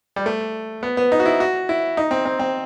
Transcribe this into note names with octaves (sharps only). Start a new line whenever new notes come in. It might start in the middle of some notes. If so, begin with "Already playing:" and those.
G3
A3
B3
B3
D#4
F#4
E4
F#4
E4
D#4
C4
C4
C4